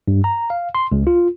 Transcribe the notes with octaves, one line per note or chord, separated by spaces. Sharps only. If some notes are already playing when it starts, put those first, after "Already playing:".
G2
A#5
F5
C6
C#2
F4